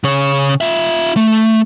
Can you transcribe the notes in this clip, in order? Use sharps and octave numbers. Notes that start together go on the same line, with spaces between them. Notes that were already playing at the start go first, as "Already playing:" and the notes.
C#3 C#5
F4 E5
A3